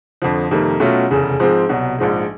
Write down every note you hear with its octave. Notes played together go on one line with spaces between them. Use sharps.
F2 D3 F3
F2 C3 D#3 G3 A#3
B2 F#3 A3 C#4 F4
F1 E2 C#3
G#2 F3 G#3 C4
C2 B2 F#3
A#1 G#2 F3 G#3